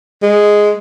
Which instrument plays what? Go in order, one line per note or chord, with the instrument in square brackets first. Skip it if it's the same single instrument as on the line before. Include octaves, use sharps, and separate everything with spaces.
[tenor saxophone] G#3